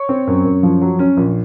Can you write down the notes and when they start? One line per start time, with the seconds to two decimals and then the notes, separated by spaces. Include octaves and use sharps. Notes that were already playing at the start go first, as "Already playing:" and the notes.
Already playing: C#5 C#6
0.09 C4
0.27 F#2
0.45 F#2
0.63 F3
0.81 F#3
0.99 C#4
1.17 A#1